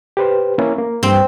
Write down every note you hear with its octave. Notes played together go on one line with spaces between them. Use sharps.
G4 B4 C5
A#3 C#4 E4
A#3
G2 C4